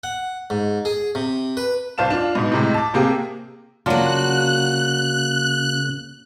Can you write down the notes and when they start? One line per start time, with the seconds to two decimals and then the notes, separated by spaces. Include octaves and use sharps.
0.04 F#5
0.50 G#2
0.85 G#4
1.15 C3
1.57 B4
1.98 C2 C5 F5 A5 E7
2.10 D4 F4
2.35 G#2 B2
2.52 A2 C3 G#3
2.74 A5 D6
2.94 C3 A#3 C4 G4 G#4
3.86 C#3 F#3 A#3 D4 F4 F#4 F#6